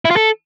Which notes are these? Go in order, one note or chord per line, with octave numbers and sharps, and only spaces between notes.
E4
F4
A4